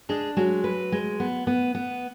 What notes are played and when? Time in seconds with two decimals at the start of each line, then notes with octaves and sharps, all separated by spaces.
0.09 G#3 D4 G#4
0.37 F#3 G#3 F#4
0.64 B4
0.92 G#3
1.20 B3
1.47 B3
1.75 B3